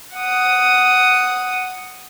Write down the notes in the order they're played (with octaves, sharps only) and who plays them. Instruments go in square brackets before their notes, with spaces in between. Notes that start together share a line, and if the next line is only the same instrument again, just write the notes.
[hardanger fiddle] F#5 D#6